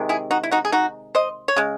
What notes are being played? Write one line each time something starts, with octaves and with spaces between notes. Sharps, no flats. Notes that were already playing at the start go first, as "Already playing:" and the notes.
Already playing: C3 D#3 G#3
E4 G#4
D#4 F#4
E4
D#4 F#4
G#4
D#4 F#4
C5 D#5
C#5
C#3 G#3